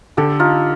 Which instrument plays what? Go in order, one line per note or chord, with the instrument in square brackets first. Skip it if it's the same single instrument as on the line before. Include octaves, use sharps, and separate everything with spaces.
[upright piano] D3 [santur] G4 A4
[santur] D#4 F4